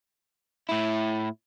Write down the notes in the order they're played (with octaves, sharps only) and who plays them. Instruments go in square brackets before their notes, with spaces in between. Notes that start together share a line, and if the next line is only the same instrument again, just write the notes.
[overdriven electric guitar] A2 E4